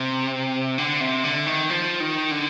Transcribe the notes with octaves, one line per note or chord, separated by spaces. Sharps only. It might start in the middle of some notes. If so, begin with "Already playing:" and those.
Already playing: C3
D3
C3
D3
D#3
F3
D#3
D3